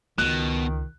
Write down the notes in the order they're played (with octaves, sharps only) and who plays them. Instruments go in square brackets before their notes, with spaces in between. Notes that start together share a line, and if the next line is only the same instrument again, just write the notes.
[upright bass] C#2 [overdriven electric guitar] B2 [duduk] D#3 [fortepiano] F#6